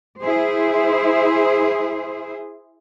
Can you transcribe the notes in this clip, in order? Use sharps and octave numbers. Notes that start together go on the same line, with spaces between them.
E4 G#4 C5